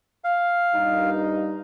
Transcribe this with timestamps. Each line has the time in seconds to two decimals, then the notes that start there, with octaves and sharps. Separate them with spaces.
0.24 F5
0.74 G2 A#2 D#4